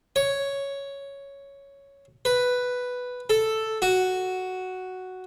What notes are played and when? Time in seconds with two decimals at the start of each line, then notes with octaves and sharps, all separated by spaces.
0.16 C#5
2.25 B4
3.30 A4
3.82 F#4